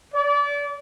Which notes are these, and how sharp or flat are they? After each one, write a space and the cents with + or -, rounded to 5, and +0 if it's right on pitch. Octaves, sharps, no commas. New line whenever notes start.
D5 -30